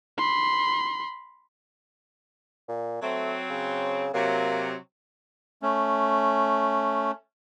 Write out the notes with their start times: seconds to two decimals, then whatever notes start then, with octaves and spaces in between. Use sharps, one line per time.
0.17 B5 C6
2.69 A#2
3.02 F#3 A3 C4
3.50 C#3
4.14 C3 F#3 A#3
5.62 A3 C#4